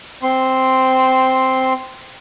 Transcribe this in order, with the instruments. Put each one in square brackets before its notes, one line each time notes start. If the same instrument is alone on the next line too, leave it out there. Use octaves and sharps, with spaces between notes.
[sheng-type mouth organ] C4 C6